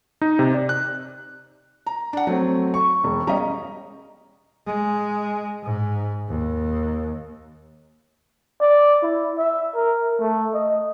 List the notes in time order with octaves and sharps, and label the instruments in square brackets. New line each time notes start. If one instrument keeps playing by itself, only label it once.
[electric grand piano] D#4
C3
D5
F#6
[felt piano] A#5
D4 F#5
[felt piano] F#3 [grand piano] A3 C4
[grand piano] C#6
[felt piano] E1
[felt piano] G3 C#4 [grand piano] D#5 A#5
[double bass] G#3
G#2
D#2
[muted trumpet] D5
E4
E5
A#4
A3
D#5